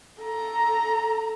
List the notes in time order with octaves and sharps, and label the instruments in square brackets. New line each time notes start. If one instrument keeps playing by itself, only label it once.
[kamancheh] A4 A#5